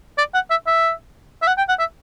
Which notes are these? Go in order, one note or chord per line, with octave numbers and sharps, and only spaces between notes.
D5
F#5
E5
E5
E5
F#5
G5
F#5
E5